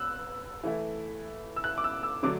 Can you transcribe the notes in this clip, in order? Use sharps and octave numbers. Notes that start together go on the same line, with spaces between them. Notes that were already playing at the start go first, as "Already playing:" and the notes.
Already playing: E6 F#6
E3 A3 E4
E6
F#6
D6
E6
E6
D3 F#3 A3 D4 D6